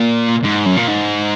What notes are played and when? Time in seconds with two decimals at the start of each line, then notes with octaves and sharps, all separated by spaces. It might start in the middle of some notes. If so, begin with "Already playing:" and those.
Already playing: A#2
0.43 G#2
0.65 F#2
0.77 A#2
0.88 G#2